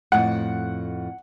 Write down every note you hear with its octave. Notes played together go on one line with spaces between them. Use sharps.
F2 A2 F#5